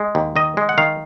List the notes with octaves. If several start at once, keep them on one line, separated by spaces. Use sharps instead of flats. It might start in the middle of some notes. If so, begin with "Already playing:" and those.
Already playing: G#3
D#2
D#3 D#5
G#3
F#5
D#3 F5